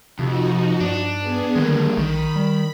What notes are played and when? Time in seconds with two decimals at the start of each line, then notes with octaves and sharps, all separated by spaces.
0.19 F2 C3 F3 D#4 F#4
0.81 G2 D4
1.17 B3 G#4
1.56 D3 D#3 G3 G#3 A#3
1.97 A#1 D#3 B5
2.36 G3